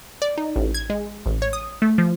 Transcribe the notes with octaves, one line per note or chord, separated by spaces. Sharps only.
D5
D#4
A1
G#6
G#3
A1
C#5
D#6
A3
F3